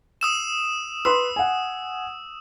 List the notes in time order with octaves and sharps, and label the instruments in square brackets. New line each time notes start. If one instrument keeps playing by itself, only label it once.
[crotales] D#6 E6 E7
[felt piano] B4 B5 C6 [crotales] E6
[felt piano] F#5 G#5